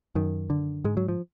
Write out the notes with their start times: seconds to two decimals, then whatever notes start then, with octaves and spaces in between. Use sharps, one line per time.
0.15 F#2 D#3
0.50 D3
0.84 G#2 G#3
0.97 F#3
1.08 F3